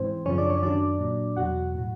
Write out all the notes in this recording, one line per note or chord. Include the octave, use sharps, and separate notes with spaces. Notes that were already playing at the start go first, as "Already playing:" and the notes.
Already playing: G#2 E3 C4 C5
F#2 C#3 F3 C#4 C#5
D4 D5
C#4 C#5
F#2 D#3 F#3 D4 D5
A#2 F#3
E2 B2 F#3 F#4 F#5
A2 F#3